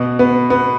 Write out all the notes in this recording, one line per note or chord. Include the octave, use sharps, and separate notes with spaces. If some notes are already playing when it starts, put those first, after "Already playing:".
Already playing: B2
B3
B3